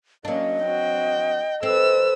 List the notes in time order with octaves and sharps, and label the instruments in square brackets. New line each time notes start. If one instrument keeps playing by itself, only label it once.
[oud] F#3 D4 [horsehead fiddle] A#3 C#4 [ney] D#5
[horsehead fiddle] C4 F#4 [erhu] G5
[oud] C4 [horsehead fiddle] A4 B4 [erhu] E6